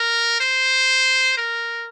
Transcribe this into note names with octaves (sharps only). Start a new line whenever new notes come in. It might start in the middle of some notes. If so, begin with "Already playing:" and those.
Already playing: A#4
C5
A#4